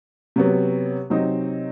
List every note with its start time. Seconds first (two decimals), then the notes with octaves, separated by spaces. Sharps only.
0.36 C3 F#3 B3
1.10 C3 F#3 C4 D#4